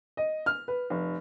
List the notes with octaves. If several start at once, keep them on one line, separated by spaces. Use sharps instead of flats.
D#5
F6
B4
F1